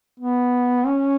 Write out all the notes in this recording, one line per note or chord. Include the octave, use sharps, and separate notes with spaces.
B3
C#4